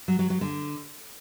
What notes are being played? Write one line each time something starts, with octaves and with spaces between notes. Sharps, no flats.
F#3
F#3
F#3
D3